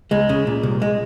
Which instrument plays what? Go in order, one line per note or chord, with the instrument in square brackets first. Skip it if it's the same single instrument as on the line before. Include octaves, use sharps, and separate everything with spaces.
[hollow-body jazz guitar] C#2 G#3
C#3
A#2
C2
G#3